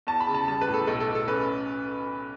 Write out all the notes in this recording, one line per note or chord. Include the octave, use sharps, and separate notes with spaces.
E2 A5
B5
C#3
A5
G3 A5
B4
A2
A4
B1 A4
A4
B1
A4
C#4 B4